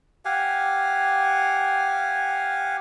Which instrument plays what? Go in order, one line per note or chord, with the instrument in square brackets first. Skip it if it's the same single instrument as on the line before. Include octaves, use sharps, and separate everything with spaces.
[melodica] G4 F5 F#5 G#5